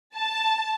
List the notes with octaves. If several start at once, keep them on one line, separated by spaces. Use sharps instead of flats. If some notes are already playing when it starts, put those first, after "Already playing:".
A5